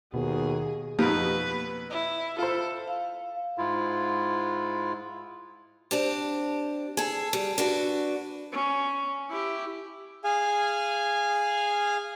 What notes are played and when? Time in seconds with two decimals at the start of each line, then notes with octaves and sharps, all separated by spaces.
0.14 D#2 B2 B3 F#4 G#4
0.99 F2 B2 A#3 D#4 G4 B4
1.90 E4
2.38 F4 A4 C5
2.88 F5
3.58 G#2 E4 F4
5.91 C4 D4 G4
6.97 G#4 A4
7.33 G3
7.58 D4 F#4 B4
8.52 C#4
9.30 E4 G4
10.24 G#4 F5 G#5